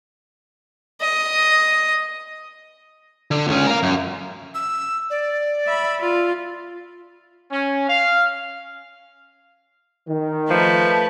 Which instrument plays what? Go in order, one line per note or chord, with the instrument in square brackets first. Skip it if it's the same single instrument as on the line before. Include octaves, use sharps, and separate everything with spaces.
[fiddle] D#5
[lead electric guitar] D3
C#2 C#4
A#4 F5
F#2
[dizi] E6
D5
[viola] E5 B5
F4
[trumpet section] C#4
F5
[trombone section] D#3
[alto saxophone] F3 [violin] A3 B4